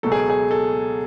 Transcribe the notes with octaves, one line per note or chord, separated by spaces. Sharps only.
C#2 B2 F#3 A4
G#4
G#4
A4